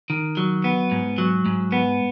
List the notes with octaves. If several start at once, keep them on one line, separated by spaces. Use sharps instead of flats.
D#3
F#3
B3
G#2
F#3
G#2
B3